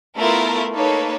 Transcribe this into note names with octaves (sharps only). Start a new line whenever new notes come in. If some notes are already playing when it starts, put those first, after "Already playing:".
A3 B3 E4 F4 A#4
A#3 D#4 A4 B4 C#5